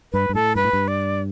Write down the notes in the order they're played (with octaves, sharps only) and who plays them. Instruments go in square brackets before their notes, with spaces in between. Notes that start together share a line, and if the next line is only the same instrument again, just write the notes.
[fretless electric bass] G2 [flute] B4
[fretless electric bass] G2
[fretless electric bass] A2 [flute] A4
[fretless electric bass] G2 [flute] B4
[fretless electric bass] A2
G2
[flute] D5